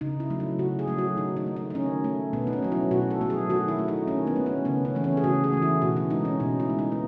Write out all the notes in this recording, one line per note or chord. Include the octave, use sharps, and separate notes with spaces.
C#3 D#4
E4
F#3 A3
E4
C#3 F#4
G#4
F#3 A3
F#4
D#3 D#4
D#4
A3
D#4
D#4
D#3 C#4
A3
B2 B3
D#4
C#4
F#3 A3
E4
B2 F#4
A4
F#3 A3
G#4
D#3 F#4
E4
A3
D#4
D#3 C#4
B3
A3
C#4
C#3 B3
C#4
E3 A3
C#4
G#4
C#3 F#4
G#4
E3 A3
E4
B2 F#4
E4
G#3 D#4
C#4
B2 D#4
E4
G#3
D#4
B3